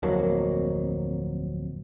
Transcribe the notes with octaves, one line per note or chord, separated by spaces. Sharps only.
D1 F2 F#3 A#3